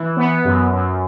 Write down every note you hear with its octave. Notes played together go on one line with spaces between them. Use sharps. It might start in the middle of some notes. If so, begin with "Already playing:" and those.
Already playing: E3
B3
F#2
F#2